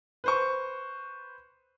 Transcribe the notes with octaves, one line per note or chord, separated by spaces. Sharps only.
B4 C5 C#6